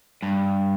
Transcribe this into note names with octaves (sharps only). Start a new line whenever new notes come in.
G2